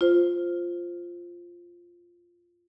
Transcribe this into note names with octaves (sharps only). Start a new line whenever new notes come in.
F4 C5